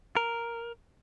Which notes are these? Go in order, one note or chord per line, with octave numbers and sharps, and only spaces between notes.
A#4